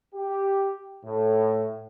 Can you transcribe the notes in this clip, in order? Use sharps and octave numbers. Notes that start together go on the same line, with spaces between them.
G4
A2